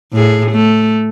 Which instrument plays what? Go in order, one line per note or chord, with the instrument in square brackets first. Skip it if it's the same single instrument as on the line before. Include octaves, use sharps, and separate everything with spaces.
[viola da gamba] A2 G#4
A3